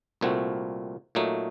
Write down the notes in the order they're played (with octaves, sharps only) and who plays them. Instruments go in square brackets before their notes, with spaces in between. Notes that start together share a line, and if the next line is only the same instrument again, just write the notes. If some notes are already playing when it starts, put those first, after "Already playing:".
[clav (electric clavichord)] C2 A#2 A3 C4 F#4
A#2 F#3 A3 D#4